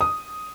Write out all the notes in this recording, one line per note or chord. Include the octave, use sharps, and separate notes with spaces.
D#6